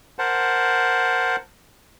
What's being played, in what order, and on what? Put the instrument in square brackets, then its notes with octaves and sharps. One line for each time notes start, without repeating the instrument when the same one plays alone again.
[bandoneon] A#4 C5 F#5 A5